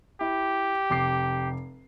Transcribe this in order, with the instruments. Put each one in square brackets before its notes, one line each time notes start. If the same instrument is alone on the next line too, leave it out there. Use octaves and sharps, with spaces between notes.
[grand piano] E4 [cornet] G4
[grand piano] F1 D6 C7